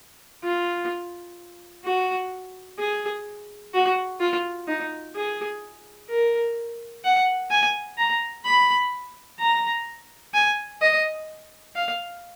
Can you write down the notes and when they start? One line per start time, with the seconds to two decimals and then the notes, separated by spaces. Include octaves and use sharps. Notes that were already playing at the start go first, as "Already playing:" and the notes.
0.44 F4
1.85 F#4
2.79 G#4
3.74 F#4
4.20 F4
4.68 D#4
5.15 G#4
6.09 A#4
7.05 F#5
7.51 G#5
7.98 A#5
8.45 B5
9.40 A#5
10.34 G#5
10.82 D#5
11.76 F5